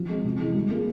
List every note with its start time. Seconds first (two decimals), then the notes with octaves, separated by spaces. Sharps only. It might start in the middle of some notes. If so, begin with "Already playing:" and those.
Already playing: F3
0.09 G#3 C4
0.24 C3
0.40 E3 G#3
0.55 G3
0.71 A#3 F4 G#4